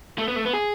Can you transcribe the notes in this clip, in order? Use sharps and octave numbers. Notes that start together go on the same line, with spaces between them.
A3
B3
A3
B3
G#4